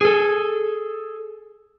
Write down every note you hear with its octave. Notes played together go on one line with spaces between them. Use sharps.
G#4 A4